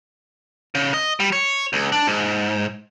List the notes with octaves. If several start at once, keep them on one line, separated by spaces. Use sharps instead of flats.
C#3
D#5
G3
C#5
C#2
D4
G#2